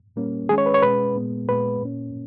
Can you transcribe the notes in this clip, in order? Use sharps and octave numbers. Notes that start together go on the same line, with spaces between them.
A#2 G3 A#3 C#4
D#3 G#3 C#4 G#4
C#5
B4
C#5
B2 G#3 C#4 B4
A#2 G#3 B3
A#2 G#3 B3 B4
A#2 A#3 C#4